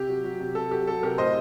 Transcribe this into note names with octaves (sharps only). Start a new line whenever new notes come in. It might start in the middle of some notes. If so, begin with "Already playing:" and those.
Already playing: C3 G4
F#3
F#3
C3
C3 A4
F#3 G4
F#3 A4
C3 G4 A#4
A2 C5 D#5